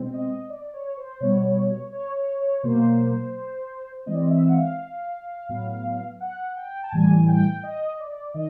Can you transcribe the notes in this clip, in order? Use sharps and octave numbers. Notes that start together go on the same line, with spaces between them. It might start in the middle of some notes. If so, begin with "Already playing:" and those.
Already playing: B2 G#3 C4
D#5
D5
C#5
C5
B2 G3 B3 C#5
C#5
C#5
C#5
B2 F#3 A#3 C5
E3 G#3 C4 D#5
D5
D#5
E5
F#5
F5
A2 F#3 B3
F#5
G5
A5
A2 E3 G3 G#5
G5
D#5
D5
D#3 D#5